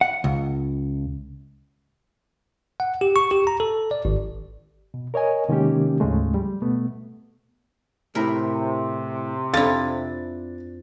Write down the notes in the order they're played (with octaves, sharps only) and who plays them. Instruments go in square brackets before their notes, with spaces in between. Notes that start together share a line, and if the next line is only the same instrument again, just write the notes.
[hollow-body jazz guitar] F#5
C#2
[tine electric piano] F#5
G4
C#6
G4
A#5
A4
D5
G#1
[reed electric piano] B2
A#4 C#5 D#5 G#5
C3 D#3 G#3 A#3 C#4 G4
D2 G#2 C#3 F3 G#3 A3
G3
B2 A3 B3
[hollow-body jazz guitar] A2 E4 [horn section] C3 [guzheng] A#4
[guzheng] F2 E4 [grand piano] D4 A6 [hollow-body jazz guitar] F5